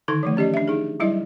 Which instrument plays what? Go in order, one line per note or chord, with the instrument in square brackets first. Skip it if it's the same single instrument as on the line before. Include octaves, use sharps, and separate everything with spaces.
[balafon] D3 D#3 D#4 A4 A5
E3 F3 A3
C#4 G4 D5 D#5
D4 E5
D#4 G#4
F#3 G3 E4 D#5 E5